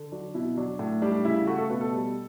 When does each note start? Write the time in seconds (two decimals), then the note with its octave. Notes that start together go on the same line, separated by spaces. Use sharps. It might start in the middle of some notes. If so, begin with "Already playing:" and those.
Already playing: D3
0.12 F#3 D4
0.34 B2 E4
0.57 F#3 D4
0.79 A2
1.02 G3 D4
1.25 C#3 E4
1.47 A3 F#4
1.58 A4
1.70 B2 B4
1.81 A4
1.93 G3